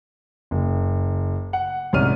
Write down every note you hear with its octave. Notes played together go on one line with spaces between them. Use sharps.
F#1
F#5
C2 G#2 C#4 F6 D#7